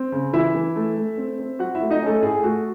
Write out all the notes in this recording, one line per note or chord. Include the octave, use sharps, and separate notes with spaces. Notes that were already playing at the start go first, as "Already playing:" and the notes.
Already playing: C4
C#3
E3 E4 E5
E3
A3
A3
C4
C4
F#3 F#4 F#5
E4 E5
A3
D#4 D#5
A3 C#4 A4
A2 G#4
A3 F#4